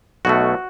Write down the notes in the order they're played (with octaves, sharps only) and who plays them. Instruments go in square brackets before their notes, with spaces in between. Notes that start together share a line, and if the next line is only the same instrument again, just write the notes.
[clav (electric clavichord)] B1 B2 A3 F#4